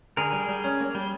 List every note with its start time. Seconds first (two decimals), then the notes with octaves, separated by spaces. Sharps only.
0.17 D3 G#4 A#4
0.33 G3
0.49 G3
0.64 C#4
0.80 A#3
0.95 G3